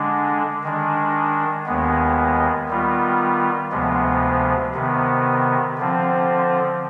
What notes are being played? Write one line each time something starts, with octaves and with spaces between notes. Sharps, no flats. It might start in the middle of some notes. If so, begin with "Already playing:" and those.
Already playing: D3 G#3 D4
D#3 G#3 D4
D#2 D#3 G#3 B3
D#3 G3 B3 F4
D2 C3 F3 G#3 B3
C3 D#3 B3
D3 F3 C4